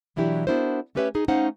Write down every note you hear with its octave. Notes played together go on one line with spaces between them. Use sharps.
B2 E3 F#3 D4 E4 G4
B3 D4 E4 F#4 A#4 C5
A3 C#4 G4 B4 C#5 E5
D#4 G#4
A3 C#4 D#4 C5 F5 F#5